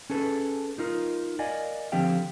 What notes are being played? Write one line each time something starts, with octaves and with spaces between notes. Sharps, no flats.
C#4 G#4 A4 B4
D#4 F4 A#4
A#4 D5 D#5 F5 G#5
D3 F3 C4 G4 F5 G5